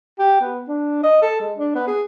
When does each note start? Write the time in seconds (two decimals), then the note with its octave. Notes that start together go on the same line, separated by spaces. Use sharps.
0.19 G4
0.41 B3
0.68 D4
1.04 D#5
1.22 A4
1.40 G#3
1.58 D4
1.75 B3
1.87 G#4